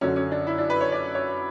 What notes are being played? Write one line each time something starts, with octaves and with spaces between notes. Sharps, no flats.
F#2 D3 F#3 C#4
C#4
D4
E4
D4
B4
C#5
D5
C#5